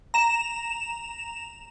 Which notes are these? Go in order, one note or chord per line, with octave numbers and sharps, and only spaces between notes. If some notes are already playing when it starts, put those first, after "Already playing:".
A#5 E7